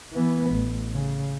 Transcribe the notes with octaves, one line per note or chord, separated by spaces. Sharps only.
E3 B3
A1
C#3